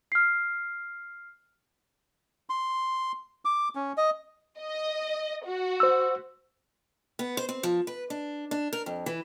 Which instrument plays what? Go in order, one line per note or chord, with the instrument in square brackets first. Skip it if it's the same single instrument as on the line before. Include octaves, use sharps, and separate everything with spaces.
[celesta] F6 C7
[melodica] C6
D6
C#4
D#5
[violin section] D#5
F#4
[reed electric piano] C5 E6
[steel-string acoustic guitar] B3
C5
C4
F3
B4
D4
D4
A#4
F2
E3